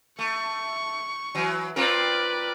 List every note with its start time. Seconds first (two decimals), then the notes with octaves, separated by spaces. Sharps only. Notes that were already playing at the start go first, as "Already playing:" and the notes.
0.19 A3 C#6
1.35 E3 F#3
1.76 C4 F4 A#4 B4 D5